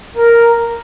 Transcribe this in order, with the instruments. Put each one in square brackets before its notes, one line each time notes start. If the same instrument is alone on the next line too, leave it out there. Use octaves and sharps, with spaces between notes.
[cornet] A#4